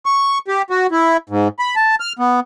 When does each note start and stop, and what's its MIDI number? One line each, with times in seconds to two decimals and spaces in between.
0.06 0.38 85
0.48 0.62 67
0.70 0.87 66
0.92 1.17 64
1.30 1.48 44
1.59 1.75 83
1.76 1.95 81
2.00 2.13 89
2.19 2.40 59